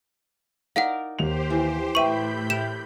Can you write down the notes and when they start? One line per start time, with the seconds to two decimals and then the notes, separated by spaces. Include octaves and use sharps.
0.76 D#4 A#4 D5 F5 F#5
1.19 D#2 G4 C5 F7
1.50 E3
1.95 A2 B4 E5 G5 B5 C#6 G6 D#7
2.50 G4 A#4 E7